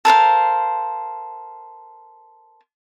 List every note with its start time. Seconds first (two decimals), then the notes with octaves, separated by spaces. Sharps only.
0.05 A4 A#4 C5 F5